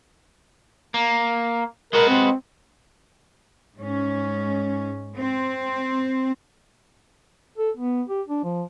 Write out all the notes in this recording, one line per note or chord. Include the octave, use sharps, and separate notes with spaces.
A#3
G#3 F#4 A#4 B4
C4
G#2 C#4
C4
A4
B3
G4
D4
F3